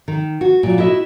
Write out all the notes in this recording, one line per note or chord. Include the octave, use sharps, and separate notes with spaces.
D#3
F#4
A#2 F#3
E4 F#4 D#5 E5